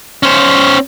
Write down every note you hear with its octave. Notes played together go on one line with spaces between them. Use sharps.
C#4 C5